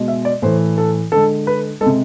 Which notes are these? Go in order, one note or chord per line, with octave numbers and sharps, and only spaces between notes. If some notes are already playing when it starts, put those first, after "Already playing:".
Already playing: B2 G#3
E5
D5
A2 E3 A3 C5
A4
D3 G#3 A4
B4
G#3 A4
C3